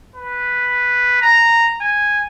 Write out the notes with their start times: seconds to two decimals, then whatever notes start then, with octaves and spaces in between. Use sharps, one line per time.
0.16 B4
1.21 A#5
1.81 G#5